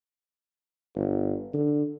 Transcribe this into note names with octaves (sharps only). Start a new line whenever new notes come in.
G1
D3